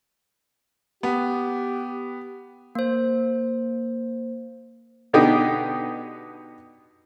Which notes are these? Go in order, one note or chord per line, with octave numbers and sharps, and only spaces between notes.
B3 G4
A#3 C5
B2 D3 B3 D#4 G4 G5